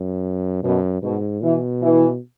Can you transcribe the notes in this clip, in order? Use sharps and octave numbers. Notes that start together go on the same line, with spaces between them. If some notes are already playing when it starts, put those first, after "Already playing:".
Already playing: F#2
F#2 B2
G#2 B2
B2 E3
E3